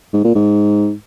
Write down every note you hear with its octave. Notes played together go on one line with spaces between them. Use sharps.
G#2
A#2
G#2